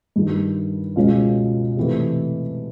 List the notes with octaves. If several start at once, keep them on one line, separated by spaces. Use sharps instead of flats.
G2 D#3 G3
C#2 B2 G#3 C#4 F4
C3 E3 A3